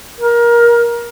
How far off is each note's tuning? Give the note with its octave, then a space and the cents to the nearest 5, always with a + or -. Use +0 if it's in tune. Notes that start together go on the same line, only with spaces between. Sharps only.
A#4 +20